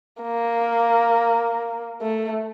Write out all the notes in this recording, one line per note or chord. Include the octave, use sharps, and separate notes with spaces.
A#3
A3